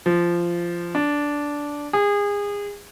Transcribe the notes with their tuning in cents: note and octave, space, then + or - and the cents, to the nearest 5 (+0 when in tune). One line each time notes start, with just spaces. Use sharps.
F3 -15
D4 -10
G#4 -30